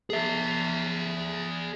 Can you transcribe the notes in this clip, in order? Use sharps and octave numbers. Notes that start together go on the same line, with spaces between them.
G#4 E5